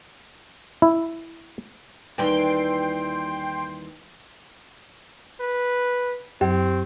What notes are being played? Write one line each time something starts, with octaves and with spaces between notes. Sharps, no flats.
E4
D#2 E3 G3 G5 C6
B4
F#2 F#3 C4 G4 G5